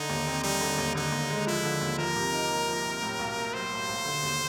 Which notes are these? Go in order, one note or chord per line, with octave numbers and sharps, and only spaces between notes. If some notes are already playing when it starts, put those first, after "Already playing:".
Already playing: D3 D#4
D#2
C4
G3 D#4
D3
D#2
D3 D#4
D#2
G#3
F3 E4
D3
D#2
F3 A#4
C3
D#4
A#3
F3
C3
A2
B1
A#3
F#3 C5
A2
B1
D3
D#2